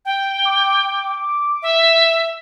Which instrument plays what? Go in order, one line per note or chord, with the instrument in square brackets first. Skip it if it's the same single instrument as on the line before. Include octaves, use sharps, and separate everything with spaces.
[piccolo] G5
[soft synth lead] D6
[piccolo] E5